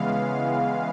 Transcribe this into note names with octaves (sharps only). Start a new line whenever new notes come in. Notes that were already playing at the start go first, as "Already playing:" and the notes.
Already playing: C#3 E3 G#3 B3 F5